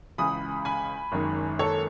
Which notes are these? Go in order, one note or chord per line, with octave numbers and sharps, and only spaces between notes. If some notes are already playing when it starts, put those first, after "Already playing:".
C#2 C#3 E3 G#3 B5 D#6
G#5 B5
F#1 F#2 D#3 G#3
A4 C#5